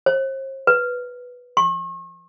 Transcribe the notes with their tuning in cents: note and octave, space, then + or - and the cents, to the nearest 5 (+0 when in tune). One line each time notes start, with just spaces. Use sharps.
C5 +40
B4 -5
C#6 -40